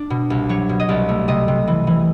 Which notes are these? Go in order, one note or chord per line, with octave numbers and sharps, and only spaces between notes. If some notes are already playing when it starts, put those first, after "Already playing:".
Already playing: D4
B2
C2
F#3 C#5
B2
D#5
C2 D5
A3
C3 D#5
C3
E3
E3